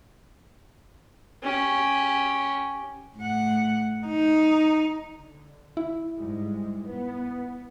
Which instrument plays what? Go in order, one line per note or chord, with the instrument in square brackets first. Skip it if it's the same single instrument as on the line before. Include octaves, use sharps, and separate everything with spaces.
[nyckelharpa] C#4 G4
[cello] A2 F#5
D#4
[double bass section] D3
[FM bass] E4
[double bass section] G#2 G3 G#3
B3